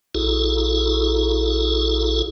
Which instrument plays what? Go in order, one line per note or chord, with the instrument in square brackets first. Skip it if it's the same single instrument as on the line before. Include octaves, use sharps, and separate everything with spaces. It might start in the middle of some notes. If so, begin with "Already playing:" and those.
[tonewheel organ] A#1 E4 F#4 G#4 A4